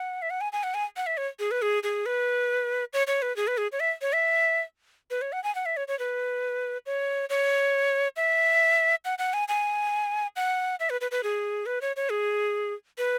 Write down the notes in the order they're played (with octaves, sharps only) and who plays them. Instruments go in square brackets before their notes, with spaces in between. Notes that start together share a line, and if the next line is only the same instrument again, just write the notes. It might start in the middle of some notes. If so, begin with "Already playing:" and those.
Already playing: [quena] F#5
E5
F#5
G#5
G#5
F#5
G#5
F#5
E5
C#5
G#4
B4
G#4
G#4
B4
C#5
C#5
B4
G#4
B4
G#4
C#5
E5
C#5
E5
B4
C#5
F#5
G#5
F#5
E5
C#5
C#5
B4
C#5
C#5
E5
F#5
F#5
G#5
G#5
F#5
E5
B4
B4
B4
G#4
B4
C#5
C#5
G#4
B4